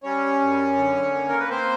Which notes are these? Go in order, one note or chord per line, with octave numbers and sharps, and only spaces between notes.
G3 C#4 C#5
F#2
D3
A#3
A#4
B4
A#3 C4 C5